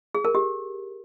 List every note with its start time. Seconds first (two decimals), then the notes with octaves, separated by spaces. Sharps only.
0.15 G#4
0.25 A#4
0.35 G4